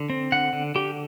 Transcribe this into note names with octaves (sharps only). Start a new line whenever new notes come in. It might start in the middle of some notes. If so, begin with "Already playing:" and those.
Already playing: D3
C4
D3 F#5
D3
D3 G4